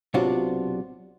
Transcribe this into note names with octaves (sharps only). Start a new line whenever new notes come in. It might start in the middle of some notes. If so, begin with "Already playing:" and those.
B1 C3 D4 F4 F#4